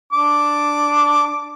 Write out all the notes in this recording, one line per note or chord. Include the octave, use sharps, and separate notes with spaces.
D4 D6